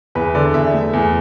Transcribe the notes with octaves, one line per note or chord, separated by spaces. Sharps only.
E2 B4
D3 D5
E2 E5
A3
E2